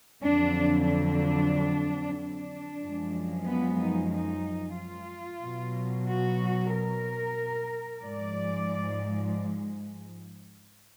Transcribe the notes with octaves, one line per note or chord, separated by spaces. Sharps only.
F2 D3 F#3 D4
D4
D4
F#2 F3 G#3
B3
D#4
D#4
F4
B2 F#3
F#4
A#4
G#2 F3 G#3 D5